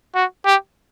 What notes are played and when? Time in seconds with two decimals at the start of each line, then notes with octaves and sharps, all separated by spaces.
0.15 F#4
0.45 G4